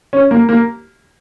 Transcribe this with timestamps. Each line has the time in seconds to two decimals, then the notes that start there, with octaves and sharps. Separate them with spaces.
0.13 C#4
0.31 A#3
0.49 A#3